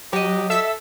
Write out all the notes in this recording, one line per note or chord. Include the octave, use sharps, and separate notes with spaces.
F#3 F#4 G4 D#5
A4 E5 E6 B6